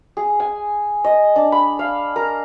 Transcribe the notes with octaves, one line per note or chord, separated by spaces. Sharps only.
G#4
G#5
D#5
D4
B5
F5
A#4